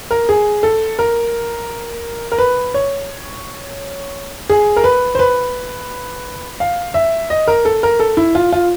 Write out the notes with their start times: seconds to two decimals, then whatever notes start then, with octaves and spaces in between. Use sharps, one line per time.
0.11 A#4
0.29 G#4
0.63 A4
0.99 A#4
2.32 A#4
2.38 B4
2.74 C#5
4.50 G#4
4.76 A#4
4.84 B4
5.15 C5
5.19 B4
6.60 F5
6.94 E5
7.30 D#5
7.47 A#4
7.65 A4
7.83 A#4
8.00 A4
8.17 E4
8.35 F4
8.52 F4